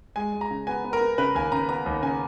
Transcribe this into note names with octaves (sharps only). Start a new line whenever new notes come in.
G#3 G#5
G#3
A#5
C#3
B3 G#5
B3
A#4
B3
C#3 B4
D#2 G#5
C#3 A#5
B3 A#5
D#2
C#3 G#5